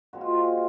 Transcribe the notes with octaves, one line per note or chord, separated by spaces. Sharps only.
A#2 G#3 C4 F#4
F4
F#4